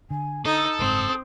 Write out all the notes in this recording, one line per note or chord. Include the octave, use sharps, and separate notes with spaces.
D3 G#5
D#4 A4 D#6
F#1 G#2 C4